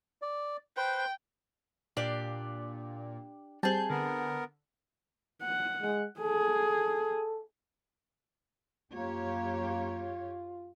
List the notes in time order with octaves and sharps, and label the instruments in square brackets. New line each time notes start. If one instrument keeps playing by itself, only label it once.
[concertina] D5
[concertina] B4 C5 [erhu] G5
[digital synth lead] A#2 [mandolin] D4 G4 D5
[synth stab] G3 C4 [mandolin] G#4 A5 [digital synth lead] G6
[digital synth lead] D3 [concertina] B3 A#4
[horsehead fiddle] F#5
[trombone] G#3
[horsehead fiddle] G#4 [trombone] A4
[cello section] F#2 G4 C#5 [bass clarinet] A#3 [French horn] F4